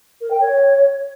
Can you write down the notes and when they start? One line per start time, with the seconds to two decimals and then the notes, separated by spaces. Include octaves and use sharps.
0.21 A#4
0.31 G5
0.40 C#5